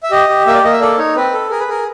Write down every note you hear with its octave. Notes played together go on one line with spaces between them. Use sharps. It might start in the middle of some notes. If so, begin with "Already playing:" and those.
E5
G4 D#5
G4
A#3 E5
D5
A#3 D#5
E5
A4 D5
D#4 C#5
C4 B4
A4
G#4 A#4
B4
G#4 A#4